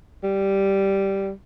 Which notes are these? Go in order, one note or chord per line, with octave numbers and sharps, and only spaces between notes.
G3